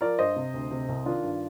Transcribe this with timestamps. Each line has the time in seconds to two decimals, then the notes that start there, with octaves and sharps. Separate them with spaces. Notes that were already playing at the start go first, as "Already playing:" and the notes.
0.01 F3 A#4 D5
0.19 G2 C5 D#5
0.36 C3
0.53 D2
0.71 C3
0.89 C2
1.06 D#3 D4 F4
1.23 G2